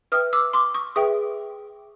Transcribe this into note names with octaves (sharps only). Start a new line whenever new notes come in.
B4 E5 G5 D#6 F6
D6 E6
C6 D6
C#6 D#6
G#4 B4 E5 G5 C#6 D#6